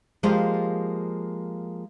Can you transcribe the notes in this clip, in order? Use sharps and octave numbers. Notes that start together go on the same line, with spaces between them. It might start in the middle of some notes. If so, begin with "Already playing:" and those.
F3 G#3 A#3 G4 C5 F5